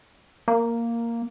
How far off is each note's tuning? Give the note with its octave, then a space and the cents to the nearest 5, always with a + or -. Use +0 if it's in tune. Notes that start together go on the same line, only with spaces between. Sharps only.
A#3 -5